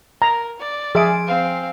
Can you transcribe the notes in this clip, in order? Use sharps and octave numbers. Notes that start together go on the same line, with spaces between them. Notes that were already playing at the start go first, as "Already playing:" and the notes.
A#4 A#5
D5
F3 G#4 E5 G#5 D7
C4 F5